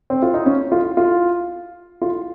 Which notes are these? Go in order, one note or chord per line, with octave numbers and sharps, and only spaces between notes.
C4
F4
D#4
C#4
F4
F4
F4